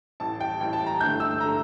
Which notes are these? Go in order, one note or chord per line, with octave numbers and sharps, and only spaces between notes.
A1 A2 G3 A5
G5
A1 A2 G3 G5
A5
A#5
A1 G2 D3 A3 G6
E6
D3 A3 A#5